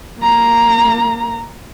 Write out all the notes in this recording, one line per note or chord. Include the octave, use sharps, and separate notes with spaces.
A#3 A#5